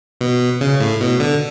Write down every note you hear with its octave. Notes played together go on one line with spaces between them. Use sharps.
B2
C#3
A2
B2
D3